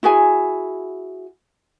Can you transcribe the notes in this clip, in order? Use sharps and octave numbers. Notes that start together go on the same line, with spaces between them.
E4 F#4 G#4 G#5